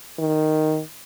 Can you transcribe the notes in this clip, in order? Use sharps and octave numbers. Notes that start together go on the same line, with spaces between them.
D#3